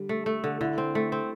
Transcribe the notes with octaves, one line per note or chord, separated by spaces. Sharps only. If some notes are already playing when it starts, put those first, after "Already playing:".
Already playing: D3 G3
A3
A3
D3
D3 E4
C4
A3
C4